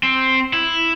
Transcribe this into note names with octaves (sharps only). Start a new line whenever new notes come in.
C4
E4